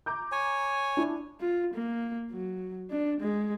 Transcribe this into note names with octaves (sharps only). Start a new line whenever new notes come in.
A#5 D6 G6
C#5 G#5
D4 E4
F4
A#3
F#3
D4
G#3